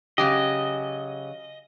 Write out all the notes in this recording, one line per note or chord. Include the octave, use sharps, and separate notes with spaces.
C#3 F#3 G4 D#5